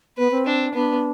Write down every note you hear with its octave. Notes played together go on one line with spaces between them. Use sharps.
B3 B4
C4
D4
B3 D4